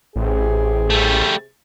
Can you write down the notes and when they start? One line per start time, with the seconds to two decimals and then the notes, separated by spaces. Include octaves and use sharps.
0.16 A1 C3 G4 G#4
0.90 G3 A3